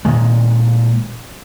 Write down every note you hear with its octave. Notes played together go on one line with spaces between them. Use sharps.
A#2 D#3 G#3